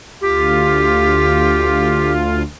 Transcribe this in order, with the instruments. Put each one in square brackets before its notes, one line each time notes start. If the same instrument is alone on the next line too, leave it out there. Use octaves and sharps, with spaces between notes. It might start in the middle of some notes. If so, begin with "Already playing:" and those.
[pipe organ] D2 F4 [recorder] G4